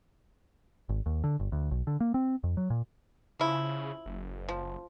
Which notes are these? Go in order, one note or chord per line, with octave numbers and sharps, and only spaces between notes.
G#1
D#2
D3
G1
D2
B1
D3
A#3
C4
F2
F#3
A#2
C#3 F3 E4
F#1
F3